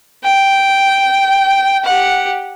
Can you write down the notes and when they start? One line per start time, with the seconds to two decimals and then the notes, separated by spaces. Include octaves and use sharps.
0.24 G5
1.85 G4 F#5